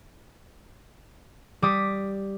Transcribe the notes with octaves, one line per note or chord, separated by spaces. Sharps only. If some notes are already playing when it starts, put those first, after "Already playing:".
G3 D6 D#6 B6